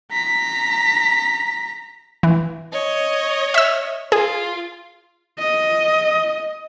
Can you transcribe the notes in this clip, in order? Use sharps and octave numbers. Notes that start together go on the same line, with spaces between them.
A#5 B6
E3
C#5 D#5
E5 E6
F4 G#4
D#5